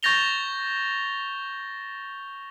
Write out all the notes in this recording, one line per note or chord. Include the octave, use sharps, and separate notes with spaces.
C#6 G6 A6 A#6 F7 G7